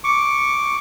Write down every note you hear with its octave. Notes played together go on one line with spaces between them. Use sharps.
C#6 D6